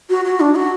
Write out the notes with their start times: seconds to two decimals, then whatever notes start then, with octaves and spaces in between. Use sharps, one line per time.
0.10 F#4
0.25 F#4
0.40 D4
0.55 F#4